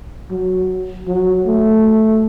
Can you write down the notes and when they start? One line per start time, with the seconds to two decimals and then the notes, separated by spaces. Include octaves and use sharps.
0.30 F#3
1.07 F#3
1.46 A3